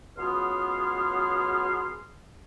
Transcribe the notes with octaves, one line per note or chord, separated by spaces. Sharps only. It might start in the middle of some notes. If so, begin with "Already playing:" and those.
C#2 F#3 B3 G#4 C6 F6